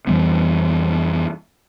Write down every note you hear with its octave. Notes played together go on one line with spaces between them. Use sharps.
F2 E3 G3 B3